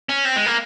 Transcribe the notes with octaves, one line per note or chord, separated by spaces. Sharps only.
C#4
C4
G#3
A#3